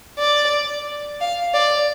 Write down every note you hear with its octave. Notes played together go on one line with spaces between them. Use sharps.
D5
F5
D5